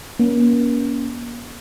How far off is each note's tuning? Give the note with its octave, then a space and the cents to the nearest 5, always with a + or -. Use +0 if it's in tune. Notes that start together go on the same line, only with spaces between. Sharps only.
A#3 +40 C#4 +25